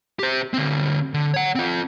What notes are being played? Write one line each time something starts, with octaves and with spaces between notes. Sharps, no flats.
G4 C5
D3 C4
D3
C#5 F#5
C4 F4